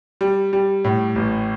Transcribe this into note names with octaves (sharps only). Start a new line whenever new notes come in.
G3
G3
A2
A1